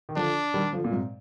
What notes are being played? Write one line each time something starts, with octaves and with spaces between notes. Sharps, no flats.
D#3
D3 F3 D4
D#3 G3
D3 F3
A#2
G#2 C3